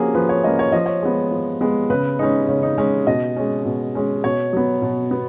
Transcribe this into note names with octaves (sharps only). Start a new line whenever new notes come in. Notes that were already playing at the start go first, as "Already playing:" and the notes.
Already playing: F3 A#3 C#4 F#4 G#4
F3 B4
C#5
A#3 C#4 D#5
C#5
F3 D#5
C#5
G#3 B3
F3
G#3 B3
C#3 B4
G#3 C#4 D#4
C#3 C#4
D#4
G#3 C#4
B2 D#5
G#3 C#4
B2
G#3 C#4
B2 C#5
F#3 B3
B2
B3